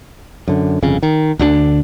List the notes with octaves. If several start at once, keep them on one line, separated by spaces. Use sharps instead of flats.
F#2 D3
G1 F2 C#3
D#3
D2 D3 E3 D4